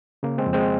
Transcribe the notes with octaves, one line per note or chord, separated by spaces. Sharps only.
C#3 A#3
G#3 C4
F2
G#3 C4